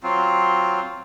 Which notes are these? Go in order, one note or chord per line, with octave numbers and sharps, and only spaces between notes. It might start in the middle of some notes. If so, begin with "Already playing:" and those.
F#3 C4 F4